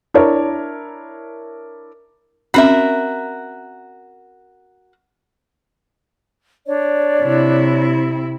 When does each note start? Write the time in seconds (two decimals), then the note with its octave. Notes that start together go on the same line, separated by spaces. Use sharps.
0.14 D4 E4 A#4 C#5
2.54 C4 C#4 F#4 A#4 E5
6.66 D4 C#5 D5
7.23 C3 E4